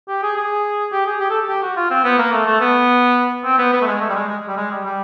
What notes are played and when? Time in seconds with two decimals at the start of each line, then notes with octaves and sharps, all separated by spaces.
0.08 G4
0.22 G#4
0.36 G#4
0.92 G4
1.06 G#4
1.20 G4
1.30 A4
1.49 G4
1.62 F#4
1.76 F4
1.90 C4
2.04 B3
2.18 A#3
2.32 A3
2.46 A3
2.61 B3
3.45 C4
3.58 B3
3.73 B3
3.82 A3
3.86 G#3
4.01 A3
4.09 G3
4.15 G#3
4.29 G#3
4.48 G3
4.57 G#3
4.71 G3
4.85 G3